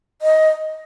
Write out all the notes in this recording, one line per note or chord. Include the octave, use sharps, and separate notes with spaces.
D#5